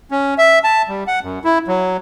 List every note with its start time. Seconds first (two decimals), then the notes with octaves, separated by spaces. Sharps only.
0.11 C#4
0.38 E5
0.64 A5
0.89 G3
1.07 F#5
1.23 F#2
1.44 E4
1.68 F#3